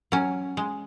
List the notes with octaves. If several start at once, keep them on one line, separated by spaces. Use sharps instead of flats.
F#3 C#4
G#3